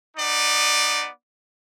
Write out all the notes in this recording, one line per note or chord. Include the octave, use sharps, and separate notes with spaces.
B3 D#4 D5